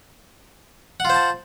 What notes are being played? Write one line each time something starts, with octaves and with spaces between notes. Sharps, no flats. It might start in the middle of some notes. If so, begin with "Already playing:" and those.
F4 C5 F#5 A5